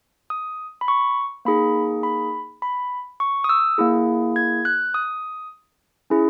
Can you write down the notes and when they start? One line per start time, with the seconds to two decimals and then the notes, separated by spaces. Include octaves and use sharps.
0.30 D#6
0.81 B5
0.88 C#6
1.45 A#3 D#4 G#4 B5
2.03 B5
2.62 B5
3.20 C#6
3.44 D#6
3.49 E6
3.78 A#3 E4 G#4
4.36 G#6
4.65 F#6
4.94 D#6
6.10 C#4 E4 G#4